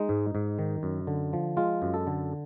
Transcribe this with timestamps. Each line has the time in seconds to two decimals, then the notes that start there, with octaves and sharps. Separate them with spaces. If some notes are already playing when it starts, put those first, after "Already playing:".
Already playing: G#3 D#4
0.09 G#2
0.35 G#2
0.59 D#3
0.83 F#2
1.07 D3
1.33 F3
1.57 G#3 F4
1.82 F#2
1.94 A4
2.07 D3